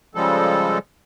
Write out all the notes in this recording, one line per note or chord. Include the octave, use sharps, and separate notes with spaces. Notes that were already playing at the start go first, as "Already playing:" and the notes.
C#3 F3 G3 G#3 A4